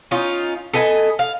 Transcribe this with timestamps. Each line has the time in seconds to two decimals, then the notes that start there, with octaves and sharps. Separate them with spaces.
0.11 C#4 D#4 F4
0.73 A4 B4 D#5 G#5
1.19 F5